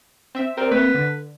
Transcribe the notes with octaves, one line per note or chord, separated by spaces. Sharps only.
C4 E5
C4 A#4 D5
A3 A#3 C4 B4
D3